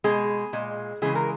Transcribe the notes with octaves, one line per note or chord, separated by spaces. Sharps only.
B2 G#3 G#4
A#2 G#3
C#3 E3 G#3 G#4
A#4